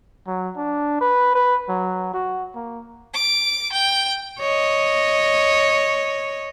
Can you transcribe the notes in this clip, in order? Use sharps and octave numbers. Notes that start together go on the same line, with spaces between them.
F#3
D4
B4
B4
F#3
F#4
A#3
D6
G5
C#5 D#5